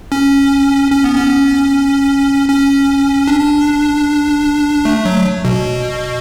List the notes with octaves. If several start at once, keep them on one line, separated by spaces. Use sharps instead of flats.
C#4
C#4
B3
C#4
C#4
D4
A3
F#3
B2